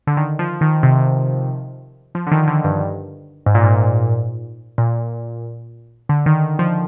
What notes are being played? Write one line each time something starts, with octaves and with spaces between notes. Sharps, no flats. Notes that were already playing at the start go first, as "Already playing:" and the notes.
D3
D#3
F3
D#3
C3
F3
D3
D#3
D3
G2
G#2
A#2
G#2
A#2
D3
D#3
F3